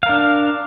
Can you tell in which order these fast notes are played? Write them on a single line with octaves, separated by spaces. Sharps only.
F5 A#4 D4